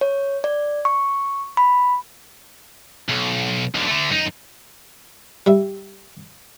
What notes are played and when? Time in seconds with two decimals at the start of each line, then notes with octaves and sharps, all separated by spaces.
0.01 C#5
0.44 D5
0.85 C#6
1.57 B5
3.09 B1
3.75 B1 D3
3.87 D3 A3
4.10 F#2 D#4
5.46 G3 E5